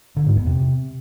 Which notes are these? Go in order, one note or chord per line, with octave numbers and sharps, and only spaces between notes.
D3
G#2
E2
C3